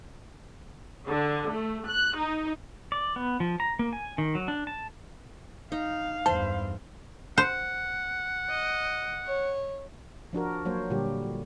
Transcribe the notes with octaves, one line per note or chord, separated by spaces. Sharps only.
D3
A3
F#6
D#4
D5
B3
F3
A#5
A#3
G#5
D#3
F#3
D4
A5
D#4 F5
E2 G2 C5 A5 B5
C5 F#5
D#5
C#5
F3 D4 F#4 A#4
F#3 A#3 C5 C#5
A#2 D3 G3 G4